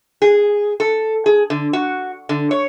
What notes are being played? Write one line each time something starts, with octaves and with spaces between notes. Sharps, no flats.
G#4
A4
G#4
D3
F#4
D3
C#5